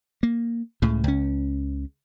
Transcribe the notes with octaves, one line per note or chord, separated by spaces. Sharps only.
A#3
C#2 A2 C#3
C#2 C#4